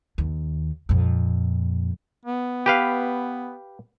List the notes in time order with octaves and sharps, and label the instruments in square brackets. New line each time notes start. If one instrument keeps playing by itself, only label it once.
[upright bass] D#2
F2 A#2
[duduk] B3
[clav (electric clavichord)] G4 B4 F5